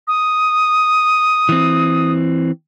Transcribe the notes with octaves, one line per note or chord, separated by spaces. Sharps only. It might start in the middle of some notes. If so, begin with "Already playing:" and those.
D#6
E3 C4